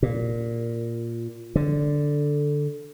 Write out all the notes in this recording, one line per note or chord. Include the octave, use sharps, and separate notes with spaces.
A#2
D3